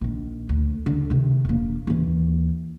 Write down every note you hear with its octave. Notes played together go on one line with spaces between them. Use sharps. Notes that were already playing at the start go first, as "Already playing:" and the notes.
A#1 D#3
D2
D3
C3 D#3
E1 A#3
D#2 E3